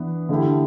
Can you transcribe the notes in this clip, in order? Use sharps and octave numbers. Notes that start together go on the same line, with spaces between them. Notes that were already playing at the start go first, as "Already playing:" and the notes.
Already playing: E3 B3 D4
D3 A3 E4 G4